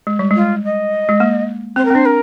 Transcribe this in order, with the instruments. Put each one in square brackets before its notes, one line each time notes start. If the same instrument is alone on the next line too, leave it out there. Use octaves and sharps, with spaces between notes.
[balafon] G#3
G3
[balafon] G#3 [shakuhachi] F4
[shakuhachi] D#5
[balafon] G#3
A#3
[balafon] C4 [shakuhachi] C5
[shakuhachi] A#4
[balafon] C4
[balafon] D4 [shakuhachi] C5
[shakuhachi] A#4